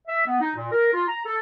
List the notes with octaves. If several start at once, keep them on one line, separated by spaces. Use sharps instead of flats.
E5
B3
D#4
A#2
A#4
F4
A#5
A4